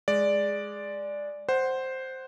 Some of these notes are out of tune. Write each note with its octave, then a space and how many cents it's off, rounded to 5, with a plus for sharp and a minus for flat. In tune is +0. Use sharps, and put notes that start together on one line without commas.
G#3 +0 D5 +0
C5 +0 F#5 +15